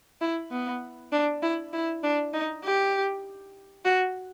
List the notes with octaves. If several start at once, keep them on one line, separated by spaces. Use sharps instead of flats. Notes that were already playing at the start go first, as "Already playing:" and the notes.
E4
B3
D4
E4
E4
D4
D#4
G4
F#4